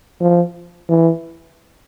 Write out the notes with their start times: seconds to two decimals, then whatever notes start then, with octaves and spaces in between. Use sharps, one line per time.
0.21 F3
0.89 E3